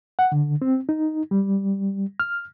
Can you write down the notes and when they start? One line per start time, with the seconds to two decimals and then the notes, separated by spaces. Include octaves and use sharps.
0.19 F#5
0.32 D3
0.62 C4
0.89 D#4
1.31 G3
2.20 F6